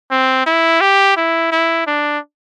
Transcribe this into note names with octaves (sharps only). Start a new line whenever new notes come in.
C4
E4
G4
E4
E4
D4